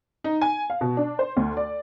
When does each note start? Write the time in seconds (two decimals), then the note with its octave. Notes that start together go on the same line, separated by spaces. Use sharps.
0.24 D#4
0.42 G#5
0.70 F5
0.81 B2
0.97 D4
1.19 C5
1.37 D2
1.57 D5